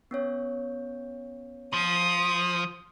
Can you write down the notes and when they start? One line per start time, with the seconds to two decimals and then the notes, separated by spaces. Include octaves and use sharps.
0.11 B3 C#4 C#5
1.74 F3 D#6